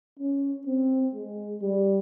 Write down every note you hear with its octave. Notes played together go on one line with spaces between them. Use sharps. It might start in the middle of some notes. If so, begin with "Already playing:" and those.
C#4
C4
G#3
G3